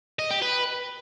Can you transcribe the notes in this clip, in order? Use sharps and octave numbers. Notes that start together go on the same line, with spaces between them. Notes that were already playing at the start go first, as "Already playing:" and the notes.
D#5
G4
B4